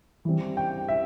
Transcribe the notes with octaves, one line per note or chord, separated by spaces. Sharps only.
E3 G3 C4
G5
E5